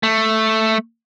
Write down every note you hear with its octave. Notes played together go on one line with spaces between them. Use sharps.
A3